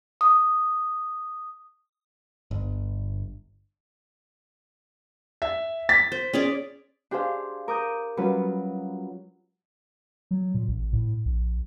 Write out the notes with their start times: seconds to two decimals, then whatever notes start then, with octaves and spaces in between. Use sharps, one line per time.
0.21 D#6
2.51 G1
5.42 E5
5.89 A6 B6
6.12 C5
6.33 C#4 G#4 D5
7.11 D4 G4 G#4 C5 F5
7.68 A#4 D6 D#6 G6
8.17 F#3 G3 C#4 F4 B4
10.31 F#3
10.54 A#2
10.68 A1
10.93 A2
11.25 A#1